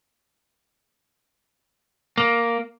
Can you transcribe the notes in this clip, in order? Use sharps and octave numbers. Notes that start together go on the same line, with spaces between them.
A#3